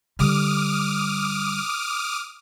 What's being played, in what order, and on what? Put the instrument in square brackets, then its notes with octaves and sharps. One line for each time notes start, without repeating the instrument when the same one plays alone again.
[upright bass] D3 G3 [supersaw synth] D6 D#6 F6